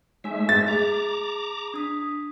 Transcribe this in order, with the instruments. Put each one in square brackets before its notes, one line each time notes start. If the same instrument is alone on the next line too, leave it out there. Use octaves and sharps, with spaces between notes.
[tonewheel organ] G#3 A3 E5 [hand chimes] D#4 C#5 G#5
[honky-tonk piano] A6
[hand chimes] G#4 [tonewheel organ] A#5 D6
[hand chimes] D4 D#6 B6